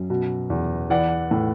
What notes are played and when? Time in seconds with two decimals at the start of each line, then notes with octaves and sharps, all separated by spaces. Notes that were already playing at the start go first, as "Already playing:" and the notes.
Already playing: F#2
0.10 B2
0.50 E2
0.90 E3 D5 F#5
1.31 A2